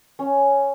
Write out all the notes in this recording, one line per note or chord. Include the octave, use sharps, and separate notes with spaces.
C#4